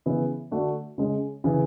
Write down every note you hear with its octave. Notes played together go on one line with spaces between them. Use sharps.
C#3 E3 B3 E4
D3 A3 D4 F#4
C#3 G#3 C#4
C#3 E3